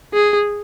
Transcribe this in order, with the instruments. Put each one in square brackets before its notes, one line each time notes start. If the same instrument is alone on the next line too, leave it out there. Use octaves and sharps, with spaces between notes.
[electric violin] G#4